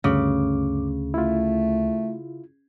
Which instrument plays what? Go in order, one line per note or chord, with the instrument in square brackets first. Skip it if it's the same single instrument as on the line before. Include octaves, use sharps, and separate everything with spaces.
[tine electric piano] D2 [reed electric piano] G2 D6 [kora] C#3
[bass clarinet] A3 [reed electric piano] E4 F4